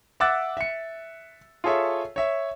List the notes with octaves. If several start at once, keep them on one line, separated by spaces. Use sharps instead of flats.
E5 F#5 D6 E6 F#6 A6
E5 C#7
F4 G#4 A4 C#5 E5
C#5 E5